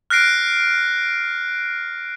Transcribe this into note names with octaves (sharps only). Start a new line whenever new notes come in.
F6 F#6 A#6 C7 D7